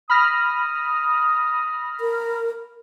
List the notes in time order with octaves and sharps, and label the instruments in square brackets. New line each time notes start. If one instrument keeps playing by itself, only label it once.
[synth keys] B5 F6 A#6 [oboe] D#6
[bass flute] A#4